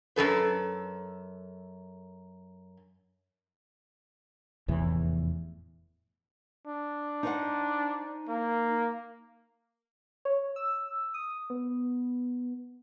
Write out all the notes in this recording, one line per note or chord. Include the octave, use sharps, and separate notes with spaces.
F#2 G3 A4 B4
F1 E2 A2 E3
D4
D#4 C5 F#5
A#3
C#5
E6
D#6
B3